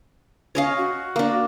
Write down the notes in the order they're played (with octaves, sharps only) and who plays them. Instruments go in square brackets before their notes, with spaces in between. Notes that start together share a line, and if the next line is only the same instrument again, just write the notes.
[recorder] C#4 [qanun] C#5 D#5 F5
[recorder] F#4
[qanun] A#3 D4